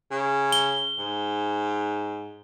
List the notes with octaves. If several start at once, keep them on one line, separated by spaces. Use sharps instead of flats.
C#3
G7
G#2